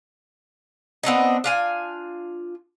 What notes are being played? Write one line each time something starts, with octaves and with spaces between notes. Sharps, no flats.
B3 C4 D4 D#4
D4 F4 G#5